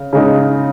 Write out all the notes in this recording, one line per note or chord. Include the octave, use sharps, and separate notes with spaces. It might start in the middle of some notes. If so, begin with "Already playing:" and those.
Already playing: C#3
C#3 G#3 D#4